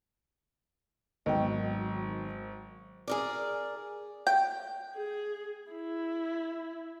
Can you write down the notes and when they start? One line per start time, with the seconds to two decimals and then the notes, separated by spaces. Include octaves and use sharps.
1.26 G#1 D#3 F#3 B3 D#5 G5
3.08 G#4 A#4 D5
4.27 G5
4.96 G#4
5.71 E4